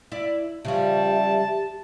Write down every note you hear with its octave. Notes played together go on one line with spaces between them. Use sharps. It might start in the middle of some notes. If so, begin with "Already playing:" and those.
E4 D5
C#3 F3 G3 G4 E5 A5